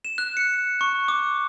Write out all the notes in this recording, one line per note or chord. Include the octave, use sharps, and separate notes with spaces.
E7
F#6
C#7
C#6
D6